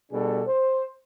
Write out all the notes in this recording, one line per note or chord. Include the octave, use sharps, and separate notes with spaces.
B2 G3 D4 G#4 A4
C5